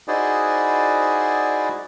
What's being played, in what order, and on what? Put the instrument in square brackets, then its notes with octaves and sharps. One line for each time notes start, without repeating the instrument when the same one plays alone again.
[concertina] D#4 E4 F#4 G#4 C5 D5